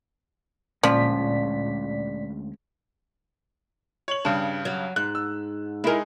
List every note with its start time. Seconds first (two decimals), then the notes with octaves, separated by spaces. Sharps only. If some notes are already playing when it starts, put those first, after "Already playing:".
0.83 D2 A#2 F3 G#3 C#4 D5 B6
4.08 C#5 F#7
4.25 G2 C#3 D4
4.65 F#3
4.96 G#2 F#6
5.15 E6
5.84 G#3 D#4 E4 G#4 A#4